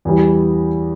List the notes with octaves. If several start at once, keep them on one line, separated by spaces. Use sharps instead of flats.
E2 E3 G3